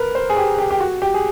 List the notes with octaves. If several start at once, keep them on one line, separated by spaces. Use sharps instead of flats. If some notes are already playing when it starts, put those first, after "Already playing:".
Already playing: A#4 B4
C5
G#4
G4
G4
G4
F#4
G4
G#4